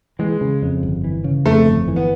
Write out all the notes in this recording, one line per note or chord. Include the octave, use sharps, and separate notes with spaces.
E3 G#3
C#3
F2
G1
E3
C#3
F2 A3
G1
E3
B3